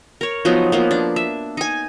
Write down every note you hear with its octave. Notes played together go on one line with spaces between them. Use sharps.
A#4 C#5
F3 F#3 B3 D#4
F3 A#3 B3
D4
E5
D#4 G#5